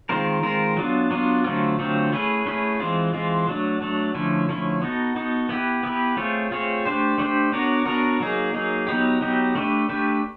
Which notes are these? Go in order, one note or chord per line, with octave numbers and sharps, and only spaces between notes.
D#3 G#3 C4 F4 A#4
D#3 G#3 C4 F4 A#4
F#3 B3 D4 F4
F#3 B3 D4 F4
D3 F#3 A3 C4 F4
D3 F#3 A3 C4 F4
A3 C#4 E4 G#4 B4
A3 C#4 E4 G#4 B4
E3 G#3 C4 F4
E3 G#3 C4 F4
F#3 A3 D4
F#3 A3 D4
D3 F3 A3 C#4 E4
D3 F3 A3 C#4 E4
B3 D#4 F#4 A4
B3 D#4 F#4 A4
B3 E4 G4 B4
B3 E4 G4 B4
A3 C4 F4 G#4 C#5
A3 C4 F4 G#4 C#5
A3 D4 G4 C5
A3 D4 G4 C5
B3 D4 F#4 A#4 C#5
B3 D4 F#4 A#4 C#5
F#3 A#3 D#4 G#4
F#3 A#3 D#4 G#4
F#3 B3 D#4 G4
F#3 B3 D#4 G4
A3 D4 G4 B4
A3 D4 G4 B4